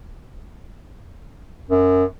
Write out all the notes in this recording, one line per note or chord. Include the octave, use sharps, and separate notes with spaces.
F#2